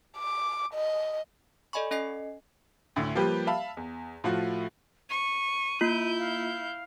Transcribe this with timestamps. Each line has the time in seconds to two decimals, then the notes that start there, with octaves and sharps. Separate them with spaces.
0.18 D6
0.74 D#5
1.73 A4 D5 D#5 G#5 B5 C#6
1.91 C#4 A4 D#5 G#5 C7
2.96 D2 A2 D3
3.15 F3 G3 A#3 G4 B4
3.47 E5 F5 A5 B5
3.77 E2
4.24 A2 F3 A3 F4 F#4
5.09 C#6 D#7
5.81 A#3 E4 F4 G6
6.19 F5